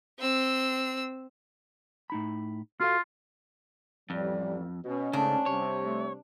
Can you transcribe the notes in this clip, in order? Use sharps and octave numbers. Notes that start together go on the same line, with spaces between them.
C4 E6
A2 D#4 B5
F4 F#4 A4 F5
A1 F2 G3
B2 C#4
G#2 C#3 A3 D4 A5
C3 G3 C#5
A3